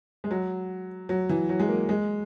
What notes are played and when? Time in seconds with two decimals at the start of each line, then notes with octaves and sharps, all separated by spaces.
0.24 G#3
0.31 F#3
1.09 F#3
1.29 E3
1.49 F#3
1.60 G#3
1.68 A#3
1.89 G#3